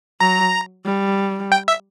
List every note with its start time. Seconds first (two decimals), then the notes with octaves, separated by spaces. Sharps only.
0.20 F#3 A#5
0.85 G3
1.52 G5
1.68 E5